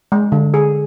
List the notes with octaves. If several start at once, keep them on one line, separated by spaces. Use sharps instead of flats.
G#3
D3
G#4